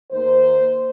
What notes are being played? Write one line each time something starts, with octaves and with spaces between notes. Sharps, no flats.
D#2 D#3 A#3 C5